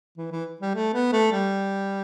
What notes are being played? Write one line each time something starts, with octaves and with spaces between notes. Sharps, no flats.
E3
E3
G3
A3
B3
A3
G3